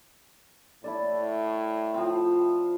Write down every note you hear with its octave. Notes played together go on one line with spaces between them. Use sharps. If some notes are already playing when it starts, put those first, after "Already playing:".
A2 E4 A4 D5
F3 C4